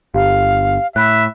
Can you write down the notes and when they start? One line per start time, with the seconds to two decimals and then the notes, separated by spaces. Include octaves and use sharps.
0.14 G1 G4 F5
0.96 A2 E5 B5 F#6